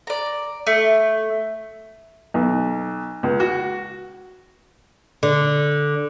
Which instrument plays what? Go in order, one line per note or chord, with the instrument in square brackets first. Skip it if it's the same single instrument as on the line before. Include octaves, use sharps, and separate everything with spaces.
[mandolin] D5 A#5
A3
[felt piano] B1
C#2
F#4
[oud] D3